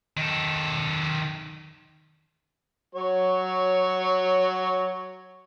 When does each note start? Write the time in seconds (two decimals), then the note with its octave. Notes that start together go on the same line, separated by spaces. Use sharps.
0.17 D#3 A4
2.95 F#3 C#5